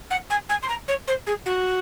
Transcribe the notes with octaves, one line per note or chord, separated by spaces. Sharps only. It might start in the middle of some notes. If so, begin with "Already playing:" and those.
F#5
G#5
G#5
C6
A#5
C#5
C5
G#4
F#4